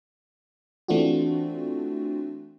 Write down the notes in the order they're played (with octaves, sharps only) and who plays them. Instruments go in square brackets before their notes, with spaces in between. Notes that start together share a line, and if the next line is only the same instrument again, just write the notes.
[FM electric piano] E3 A3 C4 D4 F4 F#4